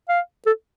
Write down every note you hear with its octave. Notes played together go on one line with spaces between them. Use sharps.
F5
A4